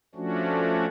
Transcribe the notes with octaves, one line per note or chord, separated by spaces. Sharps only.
F3 A3 C#4 D4 F#4